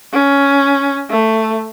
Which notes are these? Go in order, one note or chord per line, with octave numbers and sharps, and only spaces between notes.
C#4
A3